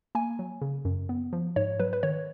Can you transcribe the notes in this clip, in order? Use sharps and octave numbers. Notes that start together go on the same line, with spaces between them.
A#3 G#5
F#3
C#3
F#2
B3
F3
G#2 C#5
F#3 B4
B4
D#3 C#5